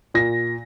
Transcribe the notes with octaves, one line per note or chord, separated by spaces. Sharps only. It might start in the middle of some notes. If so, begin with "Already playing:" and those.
A#2 A#6